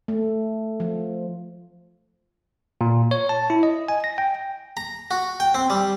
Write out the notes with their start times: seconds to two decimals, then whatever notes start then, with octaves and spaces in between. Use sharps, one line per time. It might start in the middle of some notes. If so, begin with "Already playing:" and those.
0.08 A3
0.80 F3
2.81 A#2
3.11 C#5
3.29 A5
3.50 E4
3.63 D#5
3.88 G#5
4.04 A#6
4.18 G5
4.77 A#5
5.11 F#4
5.40 G5
5.55 C4
5.70 G3